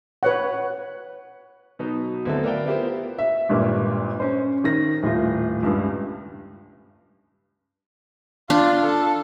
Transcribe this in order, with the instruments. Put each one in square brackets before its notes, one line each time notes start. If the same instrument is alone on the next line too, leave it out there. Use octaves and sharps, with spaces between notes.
[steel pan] B4 C#5 F#5
[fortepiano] B2 F#3 B3 D#4
D2 F#3 B3 C4 E4 A4
A#4 B4 D5 E5 F5 G5
B3 E4 F4 G4 A#4 C5
[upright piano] E5
G#1 G2 A#2
C#4 C5
D#3 A#6
D#1 A2 F4
C#2 G2
[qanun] D4 [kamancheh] F4
[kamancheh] A4